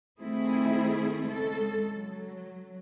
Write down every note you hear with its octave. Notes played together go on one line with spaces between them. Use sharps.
D#3 A3 C4 E4 G#4
C#3 G#3 A4
F#3